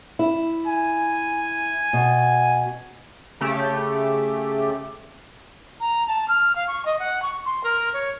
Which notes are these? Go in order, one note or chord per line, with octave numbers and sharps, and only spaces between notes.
E4
G#5
B2
C#3 A3 G4
A#5
A5
F6
F5
C#6
D#5
F#5
C#6
C6
A#4
C#5